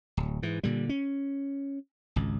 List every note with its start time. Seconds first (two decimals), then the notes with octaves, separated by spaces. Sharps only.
0.17 D1
0.43 G#2 E3
0.63 A#2 D3 G3
0.89 C#4
2.16 G#1 C#2